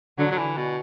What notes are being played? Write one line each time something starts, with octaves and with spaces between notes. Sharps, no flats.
D3 F#3
F#3
E3
B2